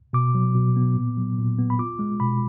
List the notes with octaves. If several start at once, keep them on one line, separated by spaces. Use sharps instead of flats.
B2 D6
F#3
B2
B3
A#2
F#3
A#2
B3
B5
F4 D6
G#3
B2 B5